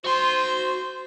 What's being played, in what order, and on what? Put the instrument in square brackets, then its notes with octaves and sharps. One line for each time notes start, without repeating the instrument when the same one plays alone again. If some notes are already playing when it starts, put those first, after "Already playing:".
[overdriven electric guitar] F#4 C6 [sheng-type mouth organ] C5